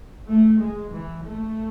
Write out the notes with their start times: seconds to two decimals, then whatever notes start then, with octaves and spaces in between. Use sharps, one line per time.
0.27 A3
0.59 G#3
0.92 E3
1.24 A3